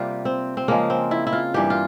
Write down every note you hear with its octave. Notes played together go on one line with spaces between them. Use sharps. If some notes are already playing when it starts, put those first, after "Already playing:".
Already playing: C3 G3 A#3 F4 G4
C4
C4
C#3 F3 G#3 A#3
C4
E4
E4
F4
G2 E3 A#3 G4
F4